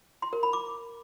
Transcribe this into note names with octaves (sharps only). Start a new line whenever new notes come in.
C6
A#4
B5
D6